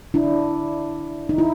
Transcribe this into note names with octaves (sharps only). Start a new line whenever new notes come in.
D4 E4
D#4
E4